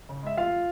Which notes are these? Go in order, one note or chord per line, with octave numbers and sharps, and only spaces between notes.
C#3
G#3 E5
F1 F4 F5